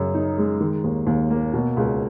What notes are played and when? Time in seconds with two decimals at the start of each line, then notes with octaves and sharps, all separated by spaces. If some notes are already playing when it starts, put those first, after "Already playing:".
Already playing: F#2 C#3
0.14 D#4
0.38 G#3
0.61 D#3
0.84 D#2
1.07 D#2
1.30 A#3
1.53 B2
1.77 C#2